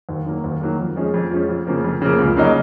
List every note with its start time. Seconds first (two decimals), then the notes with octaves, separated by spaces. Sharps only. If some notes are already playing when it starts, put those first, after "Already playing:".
0.09 D#2
0.26 D#3 F#3 A#3
0.44 D#2
0.61 D#3 F#3 A#3
0.79 F2
0.96 F3 G#3 C#4
1.14 F2
1.31 F3 G#3 C#4
1.49 F2
1.67 C#3 F3 A#3
1.84 F2
2.02 C#3 F3 A#3
2.19 C#2
2.37 C#3 F#3 A#3 D#4